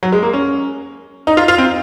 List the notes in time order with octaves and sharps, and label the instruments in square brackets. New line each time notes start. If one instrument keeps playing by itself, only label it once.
[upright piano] F#3
G#3
A#3
C#4
D#4
F4
F4
C4